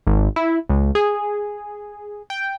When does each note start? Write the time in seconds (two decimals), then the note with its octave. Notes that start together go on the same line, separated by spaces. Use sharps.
0.07 G#1
0.36 E4
0.69 C#2
0.95 G#4
2.30 G5